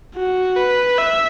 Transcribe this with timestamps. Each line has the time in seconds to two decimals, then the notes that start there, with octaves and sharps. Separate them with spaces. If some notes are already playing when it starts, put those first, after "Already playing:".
0.16 F#4
0.57 B4
0.98 E5